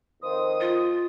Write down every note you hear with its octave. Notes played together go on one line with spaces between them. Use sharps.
F2 D#3 C5 D#6
F4